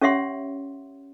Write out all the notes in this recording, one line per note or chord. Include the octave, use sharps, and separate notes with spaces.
C#4 G4 C#5 E5 F#5 C6